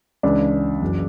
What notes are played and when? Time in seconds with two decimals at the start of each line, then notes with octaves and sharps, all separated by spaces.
0.23 C#2 C#3 E3 D4
0.81 F#1 F#2 E3